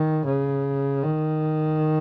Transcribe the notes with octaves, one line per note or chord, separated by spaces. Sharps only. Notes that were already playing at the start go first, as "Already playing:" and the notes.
Already playing: D#3
C#3
D#3